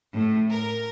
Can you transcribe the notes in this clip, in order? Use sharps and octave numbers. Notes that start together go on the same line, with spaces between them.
A2
A#4